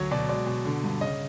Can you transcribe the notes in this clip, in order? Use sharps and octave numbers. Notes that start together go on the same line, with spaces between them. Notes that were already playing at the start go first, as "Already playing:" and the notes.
Already playing: D2 F#3 C#5
B2 D5
G#3 D5
B2
D3
G2
C#3 D#5